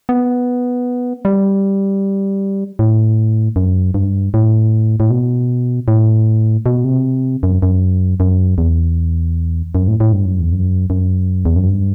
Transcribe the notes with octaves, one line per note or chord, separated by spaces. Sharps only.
B3
G3
A2
F#2
G2
A2
A2
B2
A2
B2
C3
F#2
F#2
F#2
E2
F#2
A2
A2
G2
F#2
E2
F#2
F#2
E2
F#2
G2